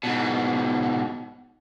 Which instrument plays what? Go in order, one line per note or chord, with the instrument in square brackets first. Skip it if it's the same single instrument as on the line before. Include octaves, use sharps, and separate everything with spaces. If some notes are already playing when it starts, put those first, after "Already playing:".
[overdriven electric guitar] G#2 B2